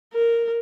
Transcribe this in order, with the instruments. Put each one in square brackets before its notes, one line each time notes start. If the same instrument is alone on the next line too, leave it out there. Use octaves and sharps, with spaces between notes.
[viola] A#4